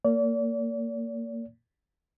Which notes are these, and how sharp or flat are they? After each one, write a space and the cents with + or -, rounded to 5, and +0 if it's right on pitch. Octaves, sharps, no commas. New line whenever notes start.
A#3 -20 D5 -40